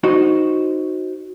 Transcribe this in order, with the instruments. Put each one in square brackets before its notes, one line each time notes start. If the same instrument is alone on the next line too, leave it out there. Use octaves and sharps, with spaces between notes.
[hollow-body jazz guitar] D#4 F#4 C5 D#5